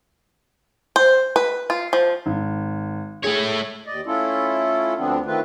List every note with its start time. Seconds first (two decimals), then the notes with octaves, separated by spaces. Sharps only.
0.96 C5
1.36 B4
1.70 F4
1.93 F3
2.26 G#1
3.24 A3 G#4 C#5
3.86 D#2 D5 D#5
4.06 A3 C#4 E4 F4 A4
4.97 D2 D3 F3 B3 C4 D4
5.26 D3 D#3 A3 C4 F4 B4